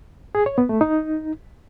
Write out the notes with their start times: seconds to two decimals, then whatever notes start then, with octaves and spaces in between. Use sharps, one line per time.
0.35 G#4
0.46 C#5
0.58 B3
0.69 A3
0.81 D#4